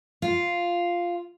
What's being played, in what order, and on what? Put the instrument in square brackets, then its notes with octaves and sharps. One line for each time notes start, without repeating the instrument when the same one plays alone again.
[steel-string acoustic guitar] F4